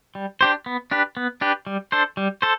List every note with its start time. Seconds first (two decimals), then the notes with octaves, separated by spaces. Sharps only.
0.15 G3
0.41 D4 G4 C5
0.66 B3
0.91 D4 G4 B4
1.17 B3
1.41 D4 G4 B4
1.67 G3
1.92 D4 A4 C5
2.17 G3
2.42 A4 C5